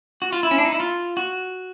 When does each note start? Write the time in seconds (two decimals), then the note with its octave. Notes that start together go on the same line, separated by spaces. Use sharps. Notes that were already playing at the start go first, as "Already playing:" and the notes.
0.22 F#4
0.32 F4
0.43 E4
0.51 C#4
0.58 D4
0.65 D#4
0.72 E4
0.80 F4
1.17 F#4